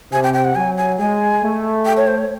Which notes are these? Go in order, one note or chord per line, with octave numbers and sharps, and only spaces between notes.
C3 G#5
G5
G5
F#5
F#3 G#5
G#5
G#3 G#5
A3
G5
C#5
C5
C#5